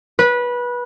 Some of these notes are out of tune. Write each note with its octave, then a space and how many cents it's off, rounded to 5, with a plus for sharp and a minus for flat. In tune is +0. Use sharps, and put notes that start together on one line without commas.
B4 -20